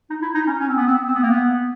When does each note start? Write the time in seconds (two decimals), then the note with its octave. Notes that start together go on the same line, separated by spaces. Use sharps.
0.10 D#4
0.22 E4
0.35 D#4
0.47 C#4
0.60 C#4
0.69 C4
0.77 B3
0.87 C4
1.08 C4
1.15 B3
1.23 A#3
1.31 B3